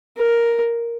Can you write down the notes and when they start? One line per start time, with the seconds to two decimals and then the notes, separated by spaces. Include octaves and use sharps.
0.17 A#4